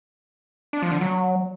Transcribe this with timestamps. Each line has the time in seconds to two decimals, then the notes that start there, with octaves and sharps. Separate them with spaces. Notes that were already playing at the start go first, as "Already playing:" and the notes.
0.73 D4
0.82 F3
0.92 D3
1.01 F#3